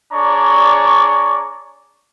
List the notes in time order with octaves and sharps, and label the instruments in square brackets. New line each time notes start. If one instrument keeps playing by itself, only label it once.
[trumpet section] D4 G#4 C#5 D5 A#5 C#6